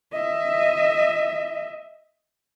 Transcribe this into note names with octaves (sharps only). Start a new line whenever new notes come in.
D#5 E5